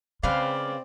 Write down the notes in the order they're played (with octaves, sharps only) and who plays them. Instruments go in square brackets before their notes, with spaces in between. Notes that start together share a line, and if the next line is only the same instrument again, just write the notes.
[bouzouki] C#3 B4 F5 [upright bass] G#3 [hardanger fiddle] C4 [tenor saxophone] D5